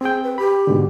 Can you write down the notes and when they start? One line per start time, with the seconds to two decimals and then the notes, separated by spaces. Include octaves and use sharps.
0.01 C4 G#4 G5
0.23 B4
0.38 G4 B5
0.67 G#2 B2 D3